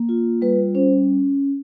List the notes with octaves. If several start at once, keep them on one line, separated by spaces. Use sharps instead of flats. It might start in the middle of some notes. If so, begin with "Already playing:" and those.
Already playing: A#3
F4
G3 B4
C#4 C5